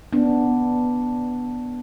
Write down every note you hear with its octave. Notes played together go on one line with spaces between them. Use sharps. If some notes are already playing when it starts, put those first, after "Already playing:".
B3 D4